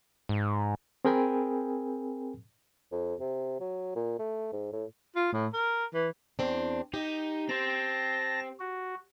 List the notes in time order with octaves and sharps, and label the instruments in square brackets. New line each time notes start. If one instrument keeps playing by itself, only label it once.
[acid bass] G#2
[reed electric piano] C4 G#4 A#4 G5 G#5 B5
[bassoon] F2
C3
F#3
A#2
A3
G#2
A2
[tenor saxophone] F4
A2
A#4
E3
[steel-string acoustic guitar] E2 C4 D4
[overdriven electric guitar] D#4 [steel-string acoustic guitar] G4
[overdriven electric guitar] C4 C5 [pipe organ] A5 A#6
[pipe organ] F#4